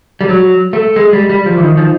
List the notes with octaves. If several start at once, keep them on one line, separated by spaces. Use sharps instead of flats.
G3
F#3
A3
G#3
G3
G3
F3
E3
D#3
F3